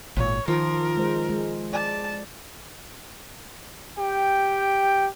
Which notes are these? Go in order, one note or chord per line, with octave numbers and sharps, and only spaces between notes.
G#1 A#2 C#5
D#3 F3 A#4
G#3 C5
G#3
D5 A5
G4 G5